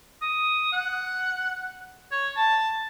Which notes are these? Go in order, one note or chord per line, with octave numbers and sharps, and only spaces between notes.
D#6
F#5
C#5
A5